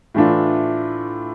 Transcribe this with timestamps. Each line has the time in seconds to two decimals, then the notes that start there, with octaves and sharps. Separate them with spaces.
0.14 A2 E3 A3 D4 F4